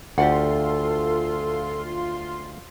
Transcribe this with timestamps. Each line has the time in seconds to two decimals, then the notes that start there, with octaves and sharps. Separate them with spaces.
0.18 D2 F4 G4 A4 D5 F#5 C6